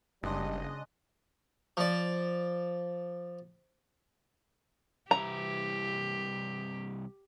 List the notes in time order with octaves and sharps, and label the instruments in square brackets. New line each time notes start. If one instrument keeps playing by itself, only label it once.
[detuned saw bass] F#1 [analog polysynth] C#3 D#5 [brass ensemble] G3 [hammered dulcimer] G#3 D4
[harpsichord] F3 D5
[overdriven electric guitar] C2 E3 [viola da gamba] G4 [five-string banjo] A#5